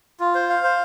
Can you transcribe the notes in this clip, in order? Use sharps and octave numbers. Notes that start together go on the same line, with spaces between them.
F4
C5
F5
C5